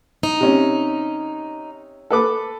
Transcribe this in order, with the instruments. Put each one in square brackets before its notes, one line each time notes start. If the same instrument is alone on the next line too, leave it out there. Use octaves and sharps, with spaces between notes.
[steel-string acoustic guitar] D#4
[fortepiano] C3 C#4
A4 B4 D6